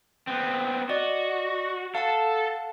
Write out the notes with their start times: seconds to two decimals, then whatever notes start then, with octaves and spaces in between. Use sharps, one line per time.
0.27 B3 C4
0.89 F#4 D5 D#5
1.95 A4 F5 F#5 A5